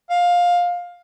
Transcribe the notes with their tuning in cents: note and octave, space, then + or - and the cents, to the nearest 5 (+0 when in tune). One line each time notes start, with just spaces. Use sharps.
F5 +15